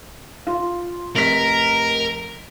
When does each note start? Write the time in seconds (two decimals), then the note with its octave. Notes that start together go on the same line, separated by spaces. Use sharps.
0.47 F4
1.16 F1 A#4 B6